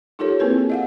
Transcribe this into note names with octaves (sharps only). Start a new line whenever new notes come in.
D#4 F4 G4 A4 A#4 C#5
A#3 C4 E4 G#4 A#4 B4
D#5 F5 F#5